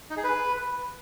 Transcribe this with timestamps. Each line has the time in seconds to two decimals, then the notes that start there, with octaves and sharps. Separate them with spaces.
0.10 D#4
0.17 G#4
0.24 B4